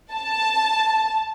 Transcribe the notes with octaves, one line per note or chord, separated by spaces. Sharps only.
A5